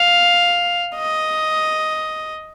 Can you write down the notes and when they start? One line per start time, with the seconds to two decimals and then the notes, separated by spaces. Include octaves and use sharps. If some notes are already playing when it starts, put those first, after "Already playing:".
Already playing: F5
0.96 D#5